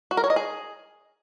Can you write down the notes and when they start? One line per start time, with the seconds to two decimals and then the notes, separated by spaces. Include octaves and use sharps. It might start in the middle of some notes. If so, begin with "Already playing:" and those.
0.11 F#4
0.17 A#4
0.24 C#5
0.30 D#5
0.36 G#4